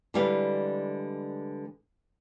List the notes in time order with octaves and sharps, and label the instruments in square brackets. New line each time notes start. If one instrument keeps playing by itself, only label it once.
[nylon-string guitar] D3 E3 G3 G#3 F5